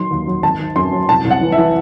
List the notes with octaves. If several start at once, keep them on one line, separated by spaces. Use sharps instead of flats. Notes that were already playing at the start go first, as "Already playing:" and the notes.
Already playing: D#3 F#3 C6
D#2
F#3
G#1 A5
D#3
F#2 C6
F#3
C2 A5
C2
F#5
E3
E3 E5